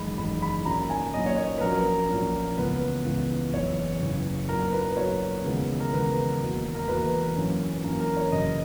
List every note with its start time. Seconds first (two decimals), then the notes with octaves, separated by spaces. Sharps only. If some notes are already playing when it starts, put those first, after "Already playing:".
Already playing: F#1 E2 D#3 G#3 B5
0.17 F#1 E2 D#3 G#3 B5
0.42 B5
0.65 B1 A#2 A#3 C#4 A#5
0.90 G#5
1.13 B1 A#2 A#3 C#4 D#5
1.26 C#5
1.38 C#5
1.58 B4
1.61 A#1 A#2 F#3 C#4 A#4
2.09 A#1 A#2 F#3 C#4
2.57 C#2 C#3 E3 B3 B4
3.05 C#2 C#3 E3 B3
3.53 F#1 E2 C#3 E3 C#5
4.01 F#1 E2 C#3 E3
4.48 B1 A#2 F#3 A#4
4.72 B4
4.96 B1 A#2 F#3 C#5
5.44 D#2 C#3 E3 G#3 B3
5.80 A#4
5.93 D#2 C#3 E3 G#3 B3 B4
6.41 E1 E2 B2 A#3
6.75 A#4
6.88 E1 E2 B2 A#3 B4
7.37 F#2 E3 A#3 C#4
7.83 F#2 E3 A#3 C#4 A#4
8.00 A#4
8.17 C#5
8.32 F#1 F#2 C#3 E3 D#5